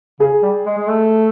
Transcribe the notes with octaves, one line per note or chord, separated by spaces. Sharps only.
C#3 G#4
G3
G#3
G#3
A3